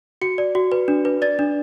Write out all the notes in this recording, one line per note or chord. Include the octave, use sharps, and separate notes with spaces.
F#4 C#7
D5
F#4
B4
D4
B4
D5 A6
D4